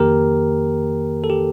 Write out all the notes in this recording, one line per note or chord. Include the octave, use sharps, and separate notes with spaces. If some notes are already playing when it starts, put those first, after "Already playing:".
Already playing: F2 D#3 A#3 G4 A#4
A4
G4